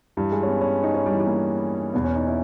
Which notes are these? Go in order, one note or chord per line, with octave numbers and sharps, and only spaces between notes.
G2 E3 G3
G#3
C#4
B3
C#4
D#4
C#4
G3
E3
G3
A#3
E2 B2 B3
C#4
D#4
E4